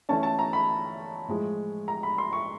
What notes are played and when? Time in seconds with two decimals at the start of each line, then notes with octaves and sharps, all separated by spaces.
0.09 E3 A3 C#4 A5
0.23 A5
0.39 A#5
0.53 B5
1.28 A2 F3 G#3
1.88 A#5
2.03 B5
2.18 C6
2.33 C#6